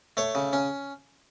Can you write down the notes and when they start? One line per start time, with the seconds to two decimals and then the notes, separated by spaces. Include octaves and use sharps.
0.17 A3 C#5
0.35 C#3
0.53 C#4